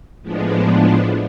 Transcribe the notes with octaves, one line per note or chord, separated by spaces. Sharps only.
A2 F3 G#3 B3 D4